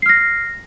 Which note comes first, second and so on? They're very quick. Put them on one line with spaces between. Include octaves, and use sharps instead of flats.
C7 F6 A#6